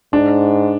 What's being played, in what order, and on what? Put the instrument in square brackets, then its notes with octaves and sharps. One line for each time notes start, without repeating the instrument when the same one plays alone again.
[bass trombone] G#2 [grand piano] D4